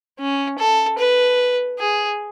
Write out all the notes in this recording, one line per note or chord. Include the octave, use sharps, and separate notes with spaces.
C#4
A4
B4
G#4